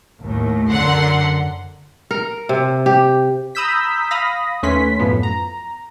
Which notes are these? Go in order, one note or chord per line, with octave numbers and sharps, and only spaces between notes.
D#2 A2
F#2 D3 A#4 F#5 C6
A#4
C3
G4
A#5 B5 D#6 E6 G6 B6
F5 B5 D#6 A#6
D#2 A3 C#4 B4 C6 B6
F#2 A2 F3 B3
A#5